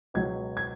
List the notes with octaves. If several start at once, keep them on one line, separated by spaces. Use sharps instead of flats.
C#2 B2 F#3 G#6
G#6